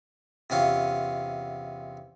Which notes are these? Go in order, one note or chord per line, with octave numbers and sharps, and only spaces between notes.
E2 C3 C#4 F4